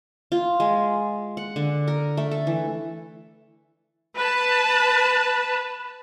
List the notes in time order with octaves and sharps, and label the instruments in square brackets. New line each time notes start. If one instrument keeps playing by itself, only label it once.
[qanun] F4
G#3
F#5
D3
A#4
A3
A4
E3
[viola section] B4 A5